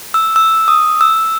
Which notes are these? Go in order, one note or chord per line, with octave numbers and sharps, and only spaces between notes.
E6
E6
D#6
E6